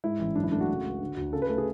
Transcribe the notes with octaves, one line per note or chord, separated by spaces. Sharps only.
G#2 E4
A1
F#2 D4
E4
A3 D4
F#4
C#3
C#2
D3
D2
C#3 A4
B4
A3 A4
G#4